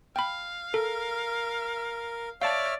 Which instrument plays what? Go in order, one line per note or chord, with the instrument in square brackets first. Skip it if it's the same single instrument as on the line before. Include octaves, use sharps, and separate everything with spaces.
[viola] F5 [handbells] G5 B5
[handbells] A4 [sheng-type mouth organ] A#4
[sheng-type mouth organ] C#5 E5 F6 [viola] D5 [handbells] F5 A5